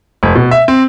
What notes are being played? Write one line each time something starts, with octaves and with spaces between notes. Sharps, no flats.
F1
B2
E5
C4